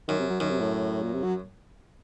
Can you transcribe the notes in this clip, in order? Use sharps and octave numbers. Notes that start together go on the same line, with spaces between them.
F#2 D#3
C3
F#3
F#2 D#3
C3
A2
A#2
C3
F#3